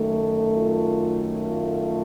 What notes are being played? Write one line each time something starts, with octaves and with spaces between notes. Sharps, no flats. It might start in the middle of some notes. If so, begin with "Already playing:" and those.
Already playing: F#2 D#3 A3
F4
F4